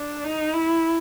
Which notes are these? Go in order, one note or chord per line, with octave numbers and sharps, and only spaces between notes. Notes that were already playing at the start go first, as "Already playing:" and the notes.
Already playing: D4
D#4
E4